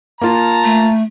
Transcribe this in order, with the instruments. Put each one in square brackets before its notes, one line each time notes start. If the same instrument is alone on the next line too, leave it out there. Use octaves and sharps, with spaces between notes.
[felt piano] A#3 F4 [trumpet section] A5 A#5
[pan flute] A3